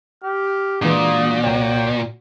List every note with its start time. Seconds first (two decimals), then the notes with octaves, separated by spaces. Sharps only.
0.24 G4 F6
0.82 A#2 E3 G#3 D4 F#4 D#6
1.44 C2 C#5 G5